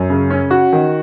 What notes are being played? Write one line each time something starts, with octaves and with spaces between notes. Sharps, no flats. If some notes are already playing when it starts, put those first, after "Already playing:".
Already playing: F#2
C#3
C#4
F#4
D#3